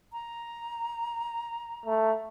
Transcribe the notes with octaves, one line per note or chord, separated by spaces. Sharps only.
A#5
A3